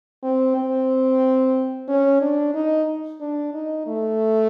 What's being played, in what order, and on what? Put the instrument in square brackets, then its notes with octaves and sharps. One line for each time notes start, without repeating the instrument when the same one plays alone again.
[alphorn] C4
C4
C#4
D4
D#4
D4
D#4
A3